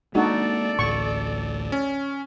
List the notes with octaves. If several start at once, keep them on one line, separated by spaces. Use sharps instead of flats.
G#3 A#3 D4 D#4 F#4 A4 D5
A1 D2 A2 C#6
C#4